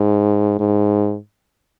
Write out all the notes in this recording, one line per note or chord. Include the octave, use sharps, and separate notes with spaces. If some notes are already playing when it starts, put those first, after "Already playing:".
Already playing: G#2
G#2